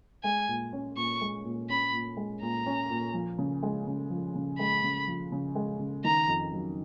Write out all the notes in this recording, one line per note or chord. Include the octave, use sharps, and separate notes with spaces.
G#3 G#5
A#2
C#4
A#2 C#6
G#3
A#2
C#4 B5
A#2
G#3
A#2 A#5
C#4
A#2
F3
C#3
G#3
C#3
F3
C#3
G#3 B5
C#3
F3
C#3
G#3
C#3
D#3 A#5
F2
F#3